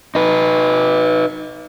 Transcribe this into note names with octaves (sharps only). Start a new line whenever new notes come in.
D#4 B4